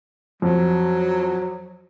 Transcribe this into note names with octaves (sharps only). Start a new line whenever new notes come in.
F2 F#3